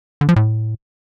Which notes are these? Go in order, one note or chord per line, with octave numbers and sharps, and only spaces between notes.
D3
F3
A2